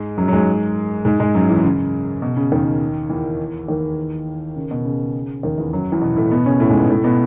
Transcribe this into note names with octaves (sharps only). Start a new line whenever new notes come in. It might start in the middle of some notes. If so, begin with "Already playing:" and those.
Already playing: G#2 G#3
F#2 F#3
F#3
G#2 G#3
G#2 G#3
G#2 G#3
F#2 F#3
E2 E3
C#3
B2
C#3
D#2 D#3
E2 E3
D#2 D#3
C#3
B2
C#3
D#2 D#3
E2 E3
F#2 F#3
E2 E3
B2 B3
A2 A3
B2 B3
C#3 C#4
A2 A3
G#2 G#3
B2 B3
A2 A3
B2 B3